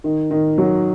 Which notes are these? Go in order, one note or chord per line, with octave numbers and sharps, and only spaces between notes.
D#3
D#3
F#3